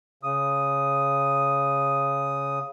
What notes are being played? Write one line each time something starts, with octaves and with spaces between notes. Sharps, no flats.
C#3 D#6